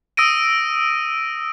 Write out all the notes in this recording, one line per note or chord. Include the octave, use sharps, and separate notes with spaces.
D#6 E6 A#6 D7 D#7